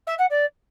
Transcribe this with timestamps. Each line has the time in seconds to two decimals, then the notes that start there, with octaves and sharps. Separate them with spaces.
0.07 E5
0.18 F#5
0.30 D5